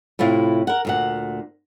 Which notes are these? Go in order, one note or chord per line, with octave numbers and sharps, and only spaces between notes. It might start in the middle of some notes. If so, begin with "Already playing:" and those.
A2 C3 E4 F4
A#4 F#5
D2 A#2 F#5